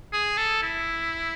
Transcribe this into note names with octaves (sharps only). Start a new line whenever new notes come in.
G#4
A4
E4